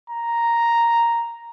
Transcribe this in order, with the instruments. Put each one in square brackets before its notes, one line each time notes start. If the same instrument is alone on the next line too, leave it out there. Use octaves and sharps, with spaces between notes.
[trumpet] A#5